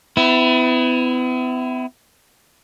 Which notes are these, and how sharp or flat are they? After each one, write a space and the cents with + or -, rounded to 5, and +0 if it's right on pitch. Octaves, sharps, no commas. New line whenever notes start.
B3 +40 E4 +0